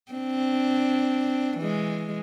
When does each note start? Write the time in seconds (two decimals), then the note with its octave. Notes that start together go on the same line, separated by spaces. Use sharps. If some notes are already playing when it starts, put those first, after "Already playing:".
0.12 C4 D4
1.58 E3 G#3